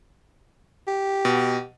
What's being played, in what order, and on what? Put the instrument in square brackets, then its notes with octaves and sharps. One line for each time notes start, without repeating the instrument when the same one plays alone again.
[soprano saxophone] G4
[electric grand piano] B2